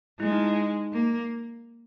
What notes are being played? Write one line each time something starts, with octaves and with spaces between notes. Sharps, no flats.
G#3 E4
D#4
D#4
A#3